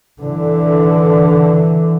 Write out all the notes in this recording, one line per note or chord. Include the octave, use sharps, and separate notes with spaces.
D3 E3